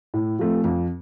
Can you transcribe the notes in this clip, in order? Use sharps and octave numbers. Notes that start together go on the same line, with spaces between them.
A2
F3 A3 C4
F2